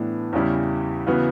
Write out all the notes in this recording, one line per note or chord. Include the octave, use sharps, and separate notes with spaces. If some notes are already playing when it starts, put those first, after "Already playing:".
Already playing: A2 E3 B3 D4
E2 C#3 G3 C#4 E4
C#3 E3 B3 F#4